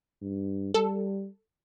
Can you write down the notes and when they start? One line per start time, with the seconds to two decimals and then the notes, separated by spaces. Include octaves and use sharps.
0.22 G2
0.74 G3 A4